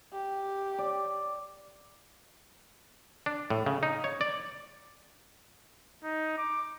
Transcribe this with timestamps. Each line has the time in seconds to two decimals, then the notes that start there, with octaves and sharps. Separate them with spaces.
0.13 G4
0.78 D5
3.26 D4
3.50 A2
3.66 C#3
3.83 D#4
4.04 C#5
4.21 D5
6.04 D#4
6.38 D6